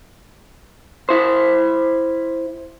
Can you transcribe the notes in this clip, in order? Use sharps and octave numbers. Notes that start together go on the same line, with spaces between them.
E4 C5